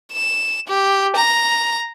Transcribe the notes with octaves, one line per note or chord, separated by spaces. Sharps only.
E7
G4
A#5